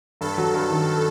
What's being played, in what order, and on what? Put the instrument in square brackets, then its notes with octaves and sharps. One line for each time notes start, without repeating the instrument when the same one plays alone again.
[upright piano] G2 [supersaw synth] A4
[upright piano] F#3
G2
D#3